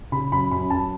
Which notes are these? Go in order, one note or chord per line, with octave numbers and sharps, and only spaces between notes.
C#3 B5
F#2 B5
F#2 B5
F#2 A5